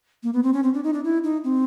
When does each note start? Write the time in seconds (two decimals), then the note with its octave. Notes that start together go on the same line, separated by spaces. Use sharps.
0.23 A#3
0.33 B3
0.43 C4
0.53 C#4
0.63 C4
0.74 D4
0.84 D#4
0.93 D4
1.04 E4
1.24 D#4
1.44 C4